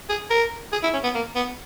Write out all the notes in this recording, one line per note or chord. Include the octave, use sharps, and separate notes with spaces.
G#4
A#4
G#4
E4
C#4
B3
A#3
B3